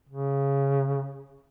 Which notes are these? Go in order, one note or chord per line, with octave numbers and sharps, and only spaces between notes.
C#3